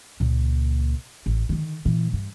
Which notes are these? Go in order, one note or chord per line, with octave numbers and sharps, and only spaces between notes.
C#2 A#2
A1
D3 D#3
A#2 E3
G2